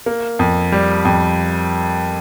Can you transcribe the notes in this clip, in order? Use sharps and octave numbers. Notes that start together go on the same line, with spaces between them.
A#3
F2
G3
F2